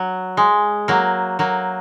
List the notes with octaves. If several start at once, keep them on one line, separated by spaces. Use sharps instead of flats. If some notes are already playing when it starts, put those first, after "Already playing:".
Already playing: F#3
G#3
F#3 A#3
F#3 A#3